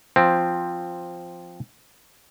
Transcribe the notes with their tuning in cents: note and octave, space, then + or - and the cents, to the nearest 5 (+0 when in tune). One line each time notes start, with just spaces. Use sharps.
F3 +0 C4 +0